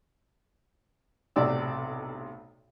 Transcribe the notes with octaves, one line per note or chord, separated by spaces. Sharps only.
B1 A2 C3 D5 E6